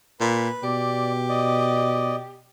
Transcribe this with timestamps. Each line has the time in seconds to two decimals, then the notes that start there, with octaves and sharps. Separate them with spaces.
0.21 A#2 B4
0.63 B2 G4 D5
1.29 D5 D#5